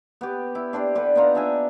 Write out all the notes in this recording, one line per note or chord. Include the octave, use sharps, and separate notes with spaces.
B3 G4
E4
D4 G4 C5 D5
D3 G4 B4
B3 D#4 F4 A#5
D4 E5 G#5